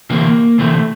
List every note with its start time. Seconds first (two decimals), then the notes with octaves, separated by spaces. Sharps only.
0.10 D2 C3 E3 A#3
0.58 D2 C3 E3 A3